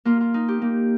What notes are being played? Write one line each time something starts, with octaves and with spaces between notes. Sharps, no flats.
A#3 F4
F4
D#4
G4
A#3